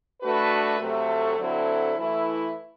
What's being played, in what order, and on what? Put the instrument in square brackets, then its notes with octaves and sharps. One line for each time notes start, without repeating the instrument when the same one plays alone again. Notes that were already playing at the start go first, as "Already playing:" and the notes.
[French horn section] A3 D4 F#4 B4
C3 F#3 A3
D3 F#3 C4 E4 A4
E3 A3 E4 B4